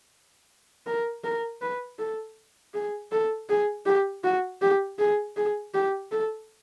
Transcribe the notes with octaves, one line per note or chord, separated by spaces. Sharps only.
A#4
A#4
B4
A4
G#4
A4
G#4
G4
F#4
G4
G#4
G#4
G4
A4